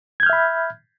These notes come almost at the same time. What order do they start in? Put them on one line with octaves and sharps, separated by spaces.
G#6 G6 F6 E5 B5